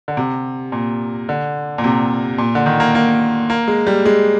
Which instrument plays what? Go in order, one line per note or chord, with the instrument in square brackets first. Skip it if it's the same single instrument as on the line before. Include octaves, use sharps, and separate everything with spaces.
[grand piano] D3
C3
A#2
D3
A#2
C3
A#2
D3
D#3
A#3
A#3
A#3
G#3
G3
G#3